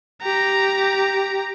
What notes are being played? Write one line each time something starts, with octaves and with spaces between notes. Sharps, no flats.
G4 A#5